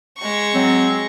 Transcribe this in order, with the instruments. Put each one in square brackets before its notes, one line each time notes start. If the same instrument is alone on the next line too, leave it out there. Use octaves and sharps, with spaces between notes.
[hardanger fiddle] G#3 C#6
[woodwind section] F#3 C4